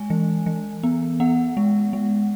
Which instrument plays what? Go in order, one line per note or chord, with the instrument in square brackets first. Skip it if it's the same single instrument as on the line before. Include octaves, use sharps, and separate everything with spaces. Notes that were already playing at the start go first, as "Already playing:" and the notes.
Already playing: [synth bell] G#3 G#5
E3
E3
B3
B3 F#5
G#3
G#3